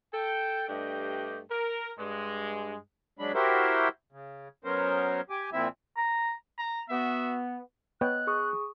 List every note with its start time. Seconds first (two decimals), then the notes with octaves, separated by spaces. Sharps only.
0.14 A4 G5
0.69 G2 A3 D4 G4 D#5 G5
1.51 A#4
1.99 G2 G#3
3.19 F#3 G#3 D4 B5
3.35 E4 F#4 G4 A#4 C5 E5
4.12 C#3
4.64 F#3 B3 C#4 A#4 C5
5.30 G4 G#5 D6
5.53 A#2 F3 C4 E4 E5
5.97 A#5
6.59 A#5
6.90 B3 F#4 E5
8.01 B3 C#5 D#5 G5 F#6
8.27 G#4 C#6 D#6